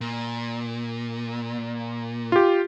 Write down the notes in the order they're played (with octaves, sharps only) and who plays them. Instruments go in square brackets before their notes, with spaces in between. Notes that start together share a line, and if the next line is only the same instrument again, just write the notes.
[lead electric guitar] A#2
[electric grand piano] F4 G4